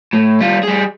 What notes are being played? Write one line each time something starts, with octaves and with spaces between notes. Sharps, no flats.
A2
G3 F4
G3 G#4